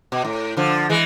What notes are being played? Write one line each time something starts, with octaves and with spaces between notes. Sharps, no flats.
B2
A2
D3 F3
E3 G#3